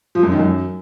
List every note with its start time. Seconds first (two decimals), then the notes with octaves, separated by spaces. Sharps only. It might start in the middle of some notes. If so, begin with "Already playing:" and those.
0.15 F3
0.23 F#2
0.31 D#3
0.40 F#2